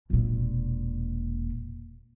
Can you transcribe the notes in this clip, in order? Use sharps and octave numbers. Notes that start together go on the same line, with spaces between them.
E1 A#2